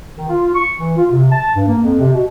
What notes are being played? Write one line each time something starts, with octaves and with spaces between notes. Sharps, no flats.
D#3
F4
C#6
E3
F4
C3
A5
G2
A#3
F2
C3
B2